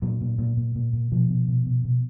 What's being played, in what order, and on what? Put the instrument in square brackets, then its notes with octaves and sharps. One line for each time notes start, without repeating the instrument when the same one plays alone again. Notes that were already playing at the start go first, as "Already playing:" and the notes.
[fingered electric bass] A#2 F#3
A#2
A#2
A#2
A#2
A#2
B2 F3
B2
B2
B2
B2